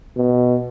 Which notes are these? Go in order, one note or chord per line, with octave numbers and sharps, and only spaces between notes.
B2